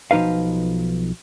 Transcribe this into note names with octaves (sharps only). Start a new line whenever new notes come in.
B1 F3 D#4 B4 F5